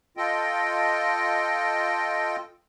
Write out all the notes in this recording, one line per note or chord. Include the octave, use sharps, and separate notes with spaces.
F4 A4 D#5 G5